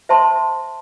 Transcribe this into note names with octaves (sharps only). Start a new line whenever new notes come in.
C5 E5 A5 C6